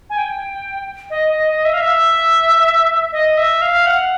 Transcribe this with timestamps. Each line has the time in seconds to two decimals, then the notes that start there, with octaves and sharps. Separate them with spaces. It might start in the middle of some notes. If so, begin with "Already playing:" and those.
0.10 G#5
0.18 G5
1.10 D#5
1.28 D#5
1.47 D#5
1.65 E5
1.74 F5
1.81 E5
3.12 D#5
3.37 E5
3.62 F5
3.86 F#5